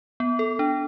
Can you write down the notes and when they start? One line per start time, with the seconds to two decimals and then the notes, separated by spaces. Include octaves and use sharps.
0.20 B3
0.39 A4
0.59 D4